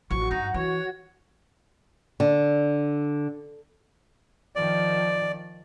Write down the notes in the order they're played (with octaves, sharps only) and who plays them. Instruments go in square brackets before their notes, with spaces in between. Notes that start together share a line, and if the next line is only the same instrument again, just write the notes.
[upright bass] A1 F3 [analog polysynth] F#4 [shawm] C#6
[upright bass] G2 [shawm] D#4
[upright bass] E3 [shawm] C#5
[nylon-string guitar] D3
[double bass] D#3 F3 [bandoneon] D5